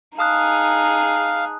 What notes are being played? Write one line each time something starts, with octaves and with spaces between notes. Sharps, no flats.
D#4 G#4 F5 A5 D#6 F#6